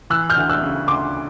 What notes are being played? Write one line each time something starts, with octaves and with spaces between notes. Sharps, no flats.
E3 E6 F#6
F6 G6
D2
E6 F#6
C#3
D2 C6 D6